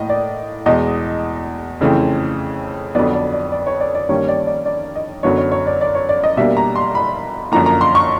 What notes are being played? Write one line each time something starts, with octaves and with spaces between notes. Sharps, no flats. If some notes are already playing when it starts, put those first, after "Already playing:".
Already playing: A2 A#3 D#5
D5
E2 B2 G#3 D#5
F2 C#3 E3 A3 C4
F2 D3 F#3 B3 D5
D5
D5
D5
C#5
D5
D5
G2 D#3 G3 A#3 C#4 C#5
D5
D5
D5
D#5
F#2 D3 F#3 B3 D4 C#5
C#5
C#5
D5
D5
C#5
D5
D#5
B2 G3 A#3 D4 E5
A#5
C6
B5
F#2 D3 F3 A#3 A#5
A#5
C6
C#6